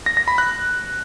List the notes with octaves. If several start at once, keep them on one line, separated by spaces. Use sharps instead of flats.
A#6
A#6
B5
F#6